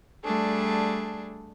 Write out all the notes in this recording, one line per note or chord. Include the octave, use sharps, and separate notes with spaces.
G3 A3 D4 G#4